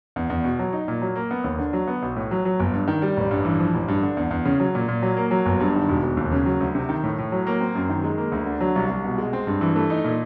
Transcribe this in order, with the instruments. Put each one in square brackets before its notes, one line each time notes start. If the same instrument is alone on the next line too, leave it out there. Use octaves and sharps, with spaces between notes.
[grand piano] E2
E2
B2
F#3
D#4
A#2
F#3
A#3
B3
D#2
D3
F#3
B3
B1
A2
F#3
F#3
G1
G2
D#3
G3
A1
G2
E3
F3
A1
G2
D3
E2
E2
C#3
F#3
A#2
A#2
F#3
A#3
F#3
G1
G2
D#3
E1
E1
D#2
C#3
F#3
D2
C3
D#3
A2
A2
F#3
A#3
C4
F#2
D#3
G#3
A#3
D2
D3
F#3
C2
C2
B2
G#3
C4
G2
E3
A3
D#4
A#2